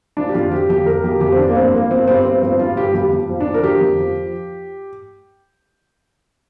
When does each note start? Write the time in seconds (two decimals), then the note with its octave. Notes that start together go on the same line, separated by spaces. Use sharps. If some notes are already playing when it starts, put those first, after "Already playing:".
0.17 F3 D4
0.29 G4
0.34 F2 F4
0.52 F3 G4
0.70 F2 G4
0.86 F3 A#4
1.04 F2 G4
1.21 F2 G4
1.32 C4
1.38 F3 D4
1.48 A#3
1.55 G2 C4
1.73 F3 A#3
1.91 F3 C4
2.08 G2 C4
2.25 G2 C4
2.42 F3 C4
2.60 G2 F4
2.77 G2 G4
2.94 F2 G4
3.12 F2
3.29 F3
3.40 D4
3.46 F3
3.54 A#4
3.63 F3 G4
3.81 F2
3.99 F3